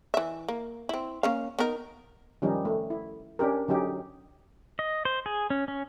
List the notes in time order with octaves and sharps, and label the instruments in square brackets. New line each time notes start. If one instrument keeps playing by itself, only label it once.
[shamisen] E3 E5
A#3
C4 E4
A#3 C#4 F5
B3 D#4 A#4
[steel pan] D#3 F3 G3 C#4 D#4
A3
E4
C#4 D4 G4 A#4
D3 F#3 C#4 D#4 G4
[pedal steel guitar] D#5
C5
G#4
C#4
C#4